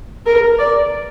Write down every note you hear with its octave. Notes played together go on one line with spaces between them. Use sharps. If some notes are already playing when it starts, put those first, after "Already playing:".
A#4
D5